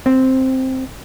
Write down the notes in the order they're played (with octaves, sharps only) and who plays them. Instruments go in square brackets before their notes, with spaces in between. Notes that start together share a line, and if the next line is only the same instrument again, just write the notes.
[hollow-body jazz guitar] C4